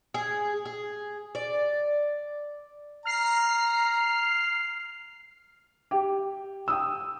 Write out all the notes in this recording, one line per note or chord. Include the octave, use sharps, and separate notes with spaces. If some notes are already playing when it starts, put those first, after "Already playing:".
G#4
G#4
D5
A#5 F6 C7
G4
G5 D#6 E6